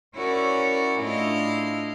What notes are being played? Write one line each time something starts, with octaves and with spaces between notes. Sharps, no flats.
C#4 E4 F#4 A#4 C#5 D5
A2 D4 E4 F4 D#5 F5